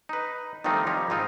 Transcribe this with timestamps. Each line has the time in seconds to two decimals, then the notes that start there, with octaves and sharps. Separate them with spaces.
0.09 D#4 B4
0.64 D#3 F3 G3 A3 C4 D#4
0.87 F3 G3 D#4 C#5
1.10 G#2 C4 D#4 F4